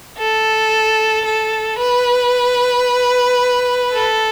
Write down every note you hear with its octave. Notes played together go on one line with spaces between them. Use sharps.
A4
A4
B4
A4